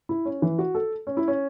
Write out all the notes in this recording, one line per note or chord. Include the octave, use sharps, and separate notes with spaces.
E4
C#4
E3
F#4
A4
C#4
E4
C#4